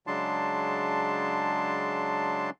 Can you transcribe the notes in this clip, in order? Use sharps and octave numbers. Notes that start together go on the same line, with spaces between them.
C#3 F#3 G#3 D4 A5 C6